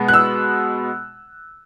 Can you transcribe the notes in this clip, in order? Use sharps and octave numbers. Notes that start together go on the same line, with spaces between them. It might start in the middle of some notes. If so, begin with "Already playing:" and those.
Already playing: B2 G#3 B3
F#6
E6